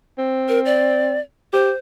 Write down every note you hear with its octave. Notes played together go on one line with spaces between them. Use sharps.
C4
A#4
D5
G4 C5